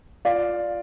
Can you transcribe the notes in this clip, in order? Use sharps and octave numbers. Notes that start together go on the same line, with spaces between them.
F4 D5 F5